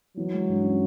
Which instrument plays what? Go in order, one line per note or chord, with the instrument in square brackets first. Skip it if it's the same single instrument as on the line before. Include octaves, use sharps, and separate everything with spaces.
[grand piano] E3 [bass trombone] F#3
[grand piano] G#3
G2
C#4